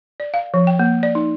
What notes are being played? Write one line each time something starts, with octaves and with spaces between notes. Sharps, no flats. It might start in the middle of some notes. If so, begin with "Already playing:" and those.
D5
F5
F3
G5
A#3
D5
D#4